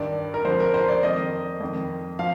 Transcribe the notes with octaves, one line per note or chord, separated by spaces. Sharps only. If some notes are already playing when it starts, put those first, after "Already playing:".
Already playing: G2 D#3 D5
A#4
F2 D3 F3 C5
A#4
C5
D5
F2 D#3 D#5
F2 D#3
F3 F5